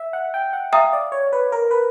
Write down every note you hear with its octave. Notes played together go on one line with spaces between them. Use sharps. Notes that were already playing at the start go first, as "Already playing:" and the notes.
Already playing: E5
F#5
G5
F#5
E5 F5 G5 A#5 D#6
D5
C#5
B4
A#4
B4